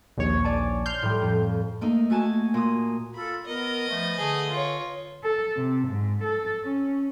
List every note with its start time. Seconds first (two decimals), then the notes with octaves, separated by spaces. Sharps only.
0.17 A#1 D#2 C#5
0.44 D5 G#5 A5
0.86 C6 F6 G6
1.02 A2 G3
1.22 F2
1.81 A3 A#3 D#4
2.10 A3 F#4 G#5 A5
2.54 A#2 D#6
3.15 F4 A4 B5
3.46 B3 A#4 B4 D#5
3.88 F3 A3
4.17 D3 A3 G#4
4.50 F4 C#5
5.23 A4
5.56 C3
5.88 G#2
6.24 A4
6.64 C#4